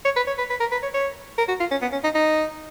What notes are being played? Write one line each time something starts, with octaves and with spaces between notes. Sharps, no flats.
C#5
B4
C#5
B4
B4
A#4
B4
C#5
C#5
A#4
F#4
F4
C#4
B3
C#4
D#4
D#4